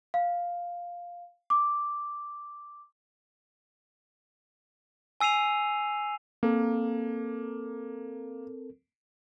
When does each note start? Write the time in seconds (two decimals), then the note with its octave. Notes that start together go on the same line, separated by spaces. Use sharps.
0.14 F5
1.50 D6
5.21 G#5 E6 C7 D#7 F7
6.43 A#3 C4 A4 A#4